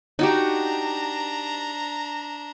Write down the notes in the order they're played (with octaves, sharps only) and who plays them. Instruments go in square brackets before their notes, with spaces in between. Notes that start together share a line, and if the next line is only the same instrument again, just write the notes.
[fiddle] D4 A#5 [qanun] D#4 F#4 G4